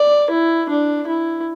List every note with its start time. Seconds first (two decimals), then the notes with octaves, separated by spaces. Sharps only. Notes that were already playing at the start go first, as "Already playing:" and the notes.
Already playing: D5
0.30 E4
0.69 D4
1.07 E4